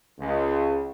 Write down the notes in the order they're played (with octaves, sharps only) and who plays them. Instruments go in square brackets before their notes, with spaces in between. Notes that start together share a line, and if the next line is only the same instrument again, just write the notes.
[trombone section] C#2